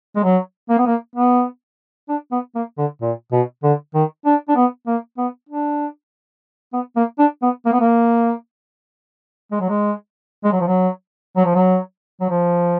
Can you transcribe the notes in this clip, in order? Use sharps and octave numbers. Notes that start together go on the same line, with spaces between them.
G#3
F#3
A#3
B3
A#3
B3
D4
B3
A#3
D3
A#2
B2
D3
D#3
D4
D4
B3
A#3
B3
D4
B3
A#3
D4
B3
A#3
B3
A#3
G#3
F#3
G#3
G#3
F#3
F3
F#3
F#3
F3
F#3
F#3
F3